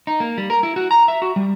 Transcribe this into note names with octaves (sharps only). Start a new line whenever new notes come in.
D#4
A#3
G3
A#4
E4
F#4
A#5
E5
F#4
G3